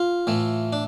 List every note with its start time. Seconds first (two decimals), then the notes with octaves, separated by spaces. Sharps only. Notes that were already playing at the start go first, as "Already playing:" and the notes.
Already playing: F4
0.27 A2 E3 A3
0.73 D4